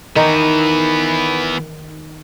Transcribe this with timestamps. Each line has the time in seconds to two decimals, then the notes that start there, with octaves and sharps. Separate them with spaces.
0.16 D#3 E3 B3 D#4